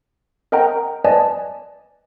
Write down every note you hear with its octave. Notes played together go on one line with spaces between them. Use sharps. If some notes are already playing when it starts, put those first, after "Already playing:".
A#4 D#5 F#5 G5 A#5
B4 D5 D#5 G#5 A5